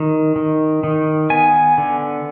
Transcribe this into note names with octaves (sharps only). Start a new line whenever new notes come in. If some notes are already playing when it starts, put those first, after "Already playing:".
Already playing: D#3
D#3
D#3
B3 G#5
D3